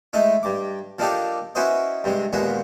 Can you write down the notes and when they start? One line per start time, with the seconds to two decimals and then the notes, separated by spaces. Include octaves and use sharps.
0.13 G#3 A3 D#4 E4
0.43 G2 D6
0.99 F3 A#3 D4 D#4 G4 A4
1.55 C#4 E4 F#4 B4 C5 D#5
2.04 G2 C3 G#3
2.33 D#2 A#2 G#3 B3 F#4